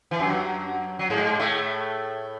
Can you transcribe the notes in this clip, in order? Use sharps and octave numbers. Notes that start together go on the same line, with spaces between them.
E3
F#2 F#3
F#3
G#2 G#3
A2 A3